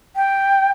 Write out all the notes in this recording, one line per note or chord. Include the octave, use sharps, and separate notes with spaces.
G5